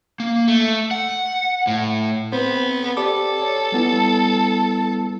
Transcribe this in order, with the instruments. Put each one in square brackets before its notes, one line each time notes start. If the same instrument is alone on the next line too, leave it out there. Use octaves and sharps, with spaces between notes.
[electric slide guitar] A#3
A3
F#5
A2
[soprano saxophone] B3 [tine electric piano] C4 C5
[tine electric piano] G4 D5 D6 [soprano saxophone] A4
[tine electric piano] C#5
G3 B3 E4